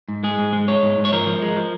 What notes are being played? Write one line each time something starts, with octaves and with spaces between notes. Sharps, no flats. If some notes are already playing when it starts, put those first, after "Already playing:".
G#2
G#3 G#4
G#2
G#3
G#3 C#5
G#2
G#2
C#5
F3 A#4
F3
G#3
F3